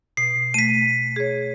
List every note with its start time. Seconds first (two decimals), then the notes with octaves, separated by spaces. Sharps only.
0.17 B2 C7
0.54 A3 B6 D#7
1.16 G#4 C#5